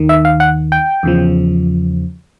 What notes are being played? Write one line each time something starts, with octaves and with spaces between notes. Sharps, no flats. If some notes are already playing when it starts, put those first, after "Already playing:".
Already playing: D#2 D#3
E5
F5
F#5
G5
E2 C#3 F3